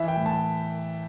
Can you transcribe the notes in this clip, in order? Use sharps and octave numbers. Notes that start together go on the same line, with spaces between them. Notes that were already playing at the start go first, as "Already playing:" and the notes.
Already playing: E3 E5
G5
A2
A5